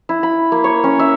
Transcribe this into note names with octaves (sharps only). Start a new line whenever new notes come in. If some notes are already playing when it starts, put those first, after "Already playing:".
E4
B5
A#3
C#5
C#4
E5